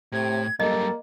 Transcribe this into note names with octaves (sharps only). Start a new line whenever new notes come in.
A2 C3 G#6
F#2 G3 A#3 A4 D#5